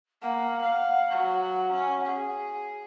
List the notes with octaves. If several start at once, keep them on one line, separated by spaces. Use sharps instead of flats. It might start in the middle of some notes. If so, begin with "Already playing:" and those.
A#3 F#5
F5
F#3
C#4
G#4